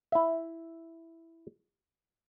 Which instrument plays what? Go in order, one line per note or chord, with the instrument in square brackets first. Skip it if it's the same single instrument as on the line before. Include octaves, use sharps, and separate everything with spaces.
[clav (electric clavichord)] E4 E5